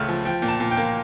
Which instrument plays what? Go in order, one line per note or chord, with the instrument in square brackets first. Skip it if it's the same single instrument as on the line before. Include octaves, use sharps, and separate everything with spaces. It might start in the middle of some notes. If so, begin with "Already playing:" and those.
Already playing: [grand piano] C#2 C#3 A3 F6
F3
F3 G5
A#2 G5
A5
A#2
G5
A#3